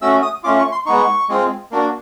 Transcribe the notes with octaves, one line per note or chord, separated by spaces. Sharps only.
A3 C#4 F#4 E6
D#6
A3 C#4 F4 D6
C#6
C6
G#3 B3 D#4 C#6
G#3 C4 F4
A#3 D4 F#4